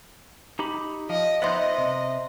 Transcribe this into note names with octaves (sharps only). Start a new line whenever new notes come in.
D#4 G4 B5
F3 D#5
B3 D#4 C5 D#5 E5 C6
C3